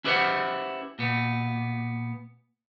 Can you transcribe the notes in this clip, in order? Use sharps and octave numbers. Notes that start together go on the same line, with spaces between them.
C#4 E4 G4 B4 C5 F#5
A#2 B3